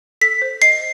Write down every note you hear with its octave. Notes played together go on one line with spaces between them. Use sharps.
A4 B6
C5
D#5 C7